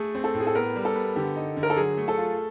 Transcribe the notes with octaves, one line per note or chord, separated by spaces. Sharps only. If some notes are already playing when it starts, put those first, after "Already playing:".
Already playing: A3 G#4 A4
C4
A4
A2
G#4
A4
B3 A#4
G3
A4
B3
D3 G4
D#4
D3
A#4
A4
F#3 G#4
A3
A4
F4